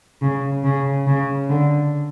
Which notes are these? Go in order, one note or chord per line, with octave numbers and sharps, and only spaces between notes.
C#3
C#3
C#3
D3